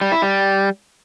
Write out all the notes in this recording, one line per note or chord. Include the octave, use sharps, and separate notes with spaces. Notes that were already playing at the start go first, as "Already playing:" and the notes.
G3
E4
G3